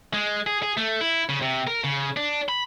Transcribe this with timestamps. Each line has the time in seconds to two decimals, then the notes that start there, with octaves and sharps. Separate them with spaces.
0.14 G#3
0.47 G#4
0.63 G#4
0.77 A3
1.01 E4
1.29 C#3
1.42 C3
1.67 A#4
1.84 C#3
2.17 D4
2.49 B5